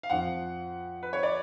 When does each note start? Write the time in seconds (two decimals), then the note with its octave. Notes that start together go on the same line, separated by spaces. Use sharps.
0.03 F5
0.10 F2 F3 F#5
1.03 B4
1.13 C#5
1.23 D5